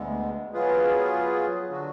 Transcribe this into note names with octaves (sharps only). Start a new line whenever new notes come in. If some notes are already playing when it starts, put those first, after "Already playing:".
Already playing: D2 D3 G#3 B3
F#3 B3 F4 G#4 B4
D3 F#3 D4 F#4